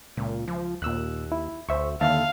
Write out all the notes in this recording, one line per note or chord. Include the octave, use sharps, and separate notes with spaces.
C#2 A#2
F3
D#2 A#2 E6 F#6
E4
D2 C5 E5 C#6
D#2 D3 E5 F5 A5